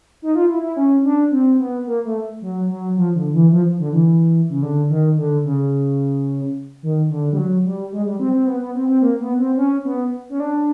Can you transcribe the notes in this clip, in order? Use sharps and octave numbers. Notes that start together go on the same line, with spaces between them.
D#4
F4
E4
E4
C#4
D4
C4
B3
A#3
A3
F#3
F#3
F3
D3
E3
F3
D3
E3
C#3
D3
D#3
D3
C#3
D#3
D3
G3
F#3
G3
G#3
G3
C4
C4
B3
B3
C4
C4
A#3
B3
C4
C#4
B3
C#4
D4